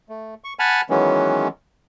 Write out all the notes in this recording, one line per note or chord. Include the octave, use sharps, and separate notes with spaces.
A3
C#6
F#5 G#5 A5 B5 F6
D#3 E3 F#3 G#3 B3 C#4